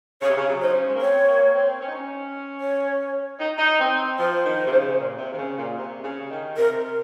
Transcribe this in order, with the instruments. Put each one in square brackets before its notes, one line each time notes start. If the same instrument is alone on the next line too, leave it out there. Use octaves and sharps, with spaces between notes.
[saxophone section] C#3 [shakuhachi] C#5
[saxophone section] C3
C#3
F#3
[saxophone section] D#4 [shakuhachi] C5
[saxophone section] C#4
G#3
A#3
[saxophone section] C4 [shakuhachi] C#5
[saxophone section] A#3
C4
C#4
D#4
C#4
[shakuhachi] C#5
[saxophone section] D#4
D#4
C4
[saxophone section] F3 [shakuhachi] C5
[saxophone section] D#3
C3
C#3
A#2
C3
D#3
C#3
A#2
C3
C#3
D#3
[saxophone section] C3 [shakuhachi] A#4